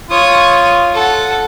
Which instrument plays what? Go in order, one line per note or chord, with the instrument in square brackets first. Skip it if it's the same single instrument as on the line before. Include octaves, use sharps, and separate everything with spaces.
[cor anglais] F4 [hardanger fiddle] C#5 D#6
[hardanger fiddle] A4 F#5